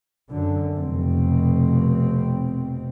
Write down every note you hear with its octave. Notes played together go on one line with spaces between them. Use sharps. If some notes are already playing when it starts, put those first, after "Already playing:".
F#2 D3
F1 B2 C4